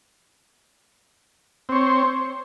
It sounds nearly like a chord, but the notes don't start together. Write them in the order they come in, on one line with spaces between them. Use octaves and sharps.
C4 C#5 C5